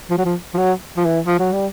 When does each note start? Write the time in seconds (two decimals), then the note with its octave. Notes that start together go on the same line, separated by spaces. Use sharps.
0.10 F3
0.18 F#3
0.25 F3
0.54 F3
0.58 F#3
0.97 F3
1.05 E3
1.26 F3
1.39 F#3
1.53 G3